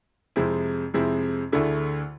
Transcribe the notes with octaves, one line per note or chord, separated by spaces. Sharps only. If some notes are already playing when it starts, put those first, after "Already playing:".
F2 C3 G#3 C4 E4
F2 C3 G#3 C4 E4
D2 D3 A3 E4 G#4